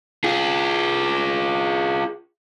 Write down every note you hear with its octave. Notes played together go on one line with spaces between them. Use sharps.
F4 G#4